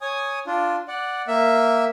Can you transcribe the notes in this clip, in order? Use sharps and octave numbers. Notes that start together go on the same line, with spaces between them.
C#5 G#5 D#6
D4 F4
D5 F#5
A#3 E5